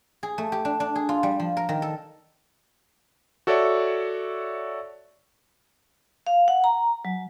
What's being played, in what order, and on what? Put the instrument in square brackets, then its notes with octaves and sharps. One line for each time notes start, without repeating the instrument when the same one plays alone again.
[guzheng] G#4
A3
G4
D4
D4
G#4
F4
G3
F3
A#4
D#3
A4
[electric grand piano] F#4 A4 C#5 D5 E5
[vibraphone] F5
F#5
A#5
F#3